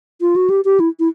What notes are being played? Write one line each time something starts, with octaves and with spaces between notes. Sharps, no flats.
F4
F#4
G4
G4
E4
E4